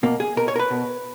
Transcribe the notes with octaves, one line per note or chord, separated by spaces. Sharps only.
B2 A#3
G#4
B2 A#4
C#5
A#4
B4
B2